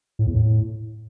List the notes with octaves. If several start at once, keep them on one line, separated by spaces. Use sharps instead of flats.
A2
E2
A2